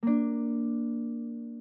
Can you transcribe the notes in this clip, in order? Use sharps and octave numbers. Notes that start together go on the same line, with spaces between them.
A#3 D4